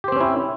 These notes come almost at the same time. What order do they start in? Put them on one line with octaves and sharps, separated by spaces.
G4 C5 C4 C#4 E4